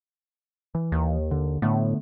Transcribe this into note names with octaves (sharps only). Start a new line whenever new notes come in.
E3
D#2
D3
A2 D3 A3 B3